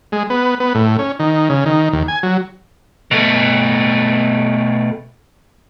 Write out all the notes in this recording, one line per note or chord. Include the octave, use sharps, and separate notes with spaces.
G#3
B3
B3
A2
C#4
D#3
C#3
D#3
D#2
G#5
F#3
B2 A3